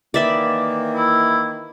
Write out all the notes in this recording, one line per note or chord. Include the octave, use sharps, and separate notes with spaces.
D#3 E3 A#3 D5 E5 B5
E4